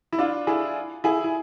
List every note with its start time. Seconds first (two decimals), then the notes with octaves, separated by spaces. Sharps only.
0.13 E4
0.19 D4 F4
0.47 E4 G#4
1.04 E4 G#4
1.24 E4